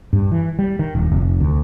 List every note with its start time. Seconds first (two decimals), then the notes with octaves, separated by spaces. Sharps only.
0.13 G2
0.32 E3
0.59 G3
0.79 D#3
0.95 D#1
1.11 F1
1.40 D2